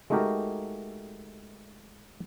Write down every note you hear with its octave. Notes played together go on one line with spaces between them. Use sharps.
G#3 A3 D#4 F#4 G4 A#4